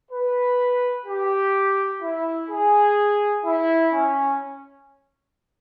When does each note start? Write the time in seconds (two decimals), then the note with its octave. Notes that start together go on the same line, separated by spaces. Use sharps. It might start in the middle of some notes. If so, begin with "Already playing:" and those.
0.12 B4
1.06 G4
2.02 E4
2.49 G#4
3.45 E4
3.92 C#4